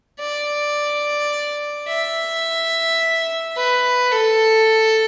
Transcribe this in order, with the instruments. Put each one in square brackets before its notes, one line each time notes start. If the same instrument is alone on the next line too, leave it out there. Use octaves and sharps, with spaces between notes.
[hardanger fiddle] D5
E5
B4
A4